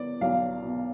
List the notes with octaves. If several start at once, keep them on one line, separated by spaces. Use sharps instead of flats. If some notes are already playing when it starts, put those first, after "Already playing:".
Already playing: B3 D5
B1 F5
B2